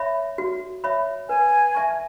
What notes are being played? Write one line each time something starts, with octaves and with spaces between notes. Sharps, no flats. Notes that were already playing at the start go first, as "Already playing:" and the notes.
Already playing: C#5 E5 B5
F#4
C#5 E5 B5
B4 G#5
E5 A5 C#6